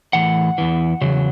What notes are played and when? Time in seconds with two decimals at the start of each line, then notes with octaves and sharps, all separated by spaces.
0.13 A2 E3 F#5
0.58 E2 E3
1.01 E2 C#3 F#3